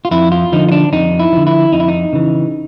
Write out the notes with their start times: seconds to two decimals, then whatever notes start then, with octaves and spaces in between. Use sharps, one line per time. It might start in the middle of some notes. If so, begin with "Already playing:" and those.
0.05 F4
0.11 F2 E4
0.32 F4
0.52 D3 F3 D#4
0.69 D#4
0.72 D4
0.92 F2 D#4
1.20 E4
1.32 D3 F3
1.47 E4
1.72 F2 D#4
1.80 E4
1.88 D#4
2.13 C#3 E3